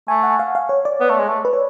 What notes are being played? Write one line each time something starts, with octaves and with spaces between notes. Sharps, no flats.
A3 G#5
F#5
F5
F5
C#5
D5
B3
A3
G#3
A3
B4
C#5